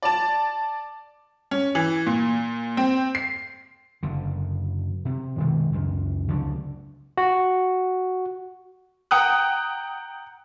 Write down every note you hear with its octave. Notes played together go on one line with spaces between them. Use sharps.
D5 A5
C#4
E3
A#2
C4
C7
F#1 D3
C3
B2 D#3 G#3 A#3
C#2 F#2
C#2 D3 F#3 D4
F#4
F#5 G5 A#5 D#6 F#6